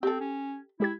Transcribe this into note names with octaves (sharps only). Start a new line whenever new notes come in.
C4 G4 A4
C#4
G#3 E4 G4 G#6